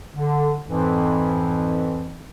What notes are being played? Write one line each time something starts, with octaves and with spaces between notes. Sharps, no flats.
D3
F2 G#2 E3